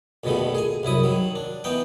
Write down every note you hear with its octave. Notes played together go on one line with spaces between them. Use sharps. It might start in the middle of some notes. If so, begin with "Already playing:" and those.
A#1 F2 B2 D3 D#3 A3
G#4 G#5
C2 F#2 E4 D#6
D#3 F#3
D4
E3 B3 D#4 G5